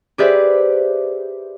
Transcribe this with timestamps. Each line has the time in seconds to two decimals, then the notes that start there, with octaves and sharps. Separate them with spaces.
0.18 G4 G#4 B4 C5 D5 E5